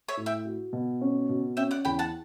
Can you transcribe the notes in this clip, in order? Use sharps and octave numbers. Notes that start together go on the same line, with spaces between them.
C#5 E5
A2
E5 G5
F#4
B2
C#4
B2
C#4 E5 G5
D5 F#5
E2 G5 B5
F#5 A5